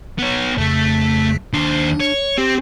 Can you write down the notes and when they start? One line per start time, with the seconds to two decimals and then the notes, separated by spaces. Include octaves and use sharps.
0.19 B3 C#5
0.58 F2 C#3 A3 B6
1.53 D#2 D4 C5
2.00 C#5
2.38 C4 G4